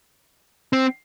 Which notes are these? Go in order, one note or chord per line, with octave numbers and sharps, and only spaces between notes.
C4